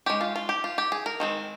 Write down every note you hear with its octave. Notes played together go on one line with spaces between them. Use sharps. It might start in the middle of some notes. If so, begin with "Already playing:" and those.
G#3 C#4 G4
F4
F4
G4
F4
G4
G#4
A#4
D#3 G#3 C4